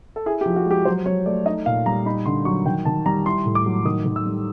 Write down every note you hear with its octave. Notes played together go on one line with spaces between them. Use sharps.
A4
E4 G#4
G4
F3
F#4
G#3 G4
F#3 C5
F#3 C#5
A3 D5
D#4 D#5
A#2 F5
G3 A#5
D#4 B5
D3 C6
F#3 C#6
D#3 G5
D#3 A5
G3 A#5
E4 C6
A2
D6
F#3
D#3 D#6
D#3
E6
G3